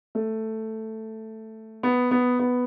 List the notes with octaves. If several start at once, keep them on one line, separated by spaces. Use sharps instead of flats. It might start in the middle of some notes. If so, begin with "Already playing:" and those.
A3
B3
B3
B3